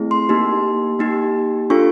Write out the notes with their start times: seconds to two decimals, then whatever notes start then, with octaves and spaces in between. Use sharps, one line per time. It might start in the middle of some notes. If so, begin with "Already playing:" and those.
Already playing: A3 C4 E4 G#4
0.11 C6
0.29 A#3 D#4 G4
0.99 A#3 D#4 G4
1.70 D4 F4 A4 C#6